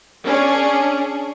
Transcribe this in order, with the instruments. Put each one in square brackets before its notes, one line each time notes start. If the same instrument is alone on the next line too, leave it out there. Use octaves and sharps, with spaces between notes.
[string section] C#4 D4 G#4